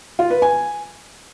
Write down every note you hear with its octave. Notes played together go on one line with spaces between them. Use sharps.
F4
B4
G#5